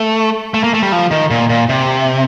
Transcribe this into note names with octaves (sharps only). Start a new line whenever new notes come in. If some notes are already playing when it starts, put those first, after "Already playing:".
Already playing: A3
A3
A#3
A3
G3
F3
D#3
A#2
A#2
C3